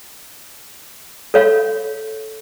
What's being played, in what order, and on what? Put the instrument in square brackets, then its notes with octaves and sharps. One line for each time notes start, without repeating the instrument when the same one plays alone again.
[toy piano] A4 C#5 F5